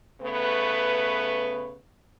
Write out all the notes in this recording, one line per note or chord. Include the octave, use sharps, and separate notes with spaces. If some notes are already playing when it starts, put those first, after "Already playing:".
C#3 A3 B3 B4